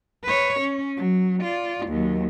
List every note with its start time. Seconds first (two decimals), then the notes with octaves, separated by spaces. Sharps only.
0.24 B4 C#5
0.60 C#4
0.97 F#3
1.42 F4 D5
1.87 D#2 F#3